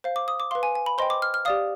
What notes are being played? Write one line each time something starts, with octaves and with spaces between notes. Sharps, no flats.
C5 F5
D6
D#6
D6
B4 F5 C6
G#5
G#5
B5
C5 D#5 G5 C6
D6
F6
F6
G4 D5 F5 D#6